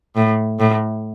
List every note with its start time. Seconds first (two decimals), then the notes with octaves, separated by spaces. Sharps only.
0.16 A2
0.60 A2